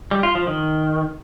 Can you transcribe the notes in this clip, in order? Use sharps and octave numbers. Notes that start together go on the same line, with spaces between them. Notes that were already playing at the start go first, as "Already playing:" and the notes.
G3
F4
F3
D#3